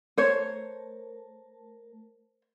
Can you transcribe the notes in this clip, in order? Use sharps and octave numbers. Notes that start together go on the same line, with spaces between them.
A3 A#4 C5 C#5 A5